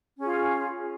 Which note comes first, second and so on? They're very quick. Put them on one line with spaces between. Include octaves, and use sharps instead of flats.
C#4 G#4 F4